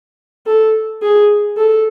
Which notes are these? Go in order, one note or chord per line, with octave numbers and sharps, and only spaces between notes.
A4
G#4
A4